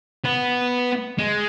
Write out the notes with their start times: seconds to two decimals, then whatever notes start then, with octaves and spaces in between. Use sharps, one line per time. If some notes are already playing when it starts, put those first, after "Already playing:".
0.25 B3
1.19 G#3